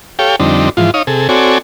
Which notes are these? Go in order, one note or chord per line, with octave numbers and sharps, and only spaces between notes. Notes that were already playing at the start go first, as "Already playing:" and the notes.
G4 A4 C#5 F5 G5
F2 D3 G3 C4 D4 D#4
G#2 E3 F3 F4
D#4 C#5 F5 D#6
C3 G#4 A4
C4 F#4 A4 C#5 D5 G#5